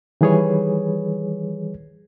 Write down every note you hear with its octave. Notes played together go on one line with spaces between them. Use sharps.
D#3 E3 G3 G#4 B4 C#5